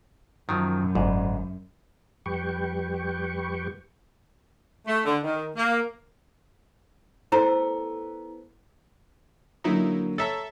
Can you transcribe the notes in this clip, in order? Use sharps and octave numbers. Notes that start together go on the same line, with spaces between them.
F#2 D#3 F3 F#3
G1 D2 G#2
F2 G3 G4 B4 G5 C#6
A3
D3
D#3
A#3
B3 E4 A4 C5 A#5
D3 F#3 A#3 D#4 E4
A4 C#5 E5 A#5